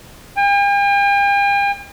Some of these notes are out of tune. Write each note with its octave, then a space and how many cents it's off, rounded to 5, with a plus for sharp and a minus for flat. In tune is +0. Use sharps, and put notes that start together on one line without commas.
G5 +45